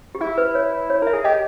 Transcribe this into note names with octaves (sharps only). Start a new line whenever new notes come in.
G4
E4 G#4
B4
C#5
C#5
A#4 E5
G#4
G4 D#5